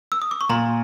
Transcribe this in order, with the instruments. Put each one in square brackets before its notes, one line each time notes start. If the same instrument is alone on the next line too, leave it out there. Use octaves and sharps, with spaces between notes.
[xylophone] E6
D#6
D6
C#6
[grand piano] A#2 [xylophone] A#5 C6